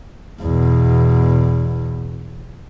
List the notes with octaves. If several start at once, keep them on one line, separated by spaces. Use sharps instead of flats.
E2 B2